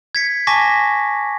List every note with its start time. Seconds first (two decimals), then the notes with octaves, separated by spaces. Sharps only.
0.15 G#6 B6 C#7
0.47 G#5 A5 C#6 D6 A#6 B6